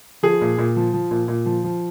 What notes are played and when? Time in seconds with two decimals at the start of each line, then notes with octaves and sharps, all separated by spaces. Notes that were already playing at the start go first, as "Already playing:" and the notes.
0.23 F3 G#4
0.41 A#2
0.58 A#2
0.76 F3
0.93 F3
1.11 A#2
1.28 A#2
1.46 F3
1.64 F3